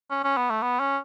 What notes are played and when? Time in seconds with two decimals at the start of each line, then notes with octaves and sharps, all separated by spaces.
0.10 C#4
0.24 C#4
0.37 B3
0.50 A3
0.62 B3
0.80 C#4